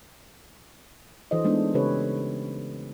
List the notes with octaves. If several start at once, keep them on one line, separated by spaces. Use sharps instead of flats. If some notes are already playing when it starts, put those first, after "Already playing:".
E3 D4 F#4 A4 C5 D#5
G#3 A3 B3 D4 D#4
C#3 C#4 G4 A4 B4 C#5